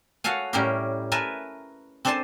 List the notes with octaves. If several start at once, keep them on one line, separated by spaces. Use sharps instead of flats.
F#4 A4 C#5 F5 G#5
A2 G3 C#4 E4 G4 A#4
A#4 B4 E5 G#5 A5
C4 D4 A4 C5 G#5 A5